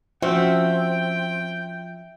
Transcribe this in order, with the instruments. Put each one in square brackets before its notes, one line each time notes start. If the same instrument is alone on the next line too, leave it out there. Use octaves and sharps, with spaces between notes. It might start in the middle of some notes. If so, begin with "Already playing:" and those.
[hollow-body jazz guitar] F3 C#4 F#4 [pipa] C4 [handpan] E5 [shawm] G5